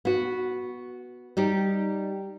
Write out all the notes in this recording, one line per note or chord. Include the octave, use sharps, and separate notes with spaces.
B3 F#4
G3 D#4 G4